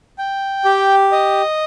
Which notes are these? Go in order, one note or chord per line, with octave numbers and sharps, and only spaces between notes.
G5
G4
D#5